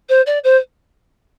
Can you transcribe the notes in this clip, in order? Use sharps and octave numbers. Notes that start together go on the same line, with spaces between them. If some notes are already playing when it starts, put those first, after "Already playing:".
C5
D5
C5